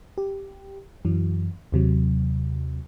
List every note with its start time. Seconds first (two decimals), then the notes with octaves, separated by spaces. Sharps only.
0.18 G4
1.05 F#2 E3 F#3
1.72 D#2 C3 F#3